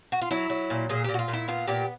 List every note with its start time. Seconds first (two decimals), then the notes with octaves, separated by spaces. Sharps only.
0.12 F#4
0.21 F4
0.31 F#3 E4
0.50 F#3
0.70 A#2
0.89 A#2 G#4
1.04 A#2 G4
1.14 F#4
1.19 F4
1.28 A#2
1.33 E4
1.48 B3 F4
1.67 A#2 G4